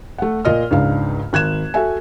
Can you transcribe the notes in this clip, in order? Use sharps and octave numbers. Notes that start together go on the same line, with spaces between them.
A3 F#5
A#2 F4 D#5 F6
C#2 G#2 D4 F5
G#1 F#6 G#6 E7
F#4 A4 E5 G#5